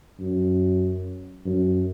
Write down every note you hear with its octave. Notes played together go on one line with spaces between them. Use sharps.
F#2
F#2